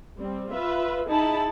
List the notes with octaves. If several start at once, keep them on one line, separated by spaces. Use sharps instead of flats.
G3 C4
F4 B4 E5
D#4 E4 G#4 A5 B5